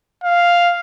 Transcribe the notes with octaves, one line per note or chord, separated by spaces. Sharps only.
F5